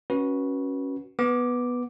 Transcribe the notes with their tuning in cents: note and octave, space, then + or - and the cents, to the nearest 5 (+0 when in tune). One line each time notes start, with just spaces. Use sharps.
C#4 -5 F#4 +0 B4 -25
B3 -5 D6 +0